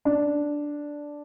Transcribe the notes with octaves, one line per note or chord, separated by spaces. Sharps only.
D4